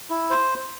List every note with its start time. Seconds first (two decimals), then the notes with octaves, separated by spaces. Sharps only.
0.10 E4
0.30 C5